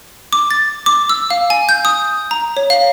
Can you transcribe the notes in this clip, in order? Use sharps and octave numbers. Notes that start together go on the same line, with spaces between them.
D6
A6
D6
E6
F5
G#5
G6
D#6
A#5
C#5
F5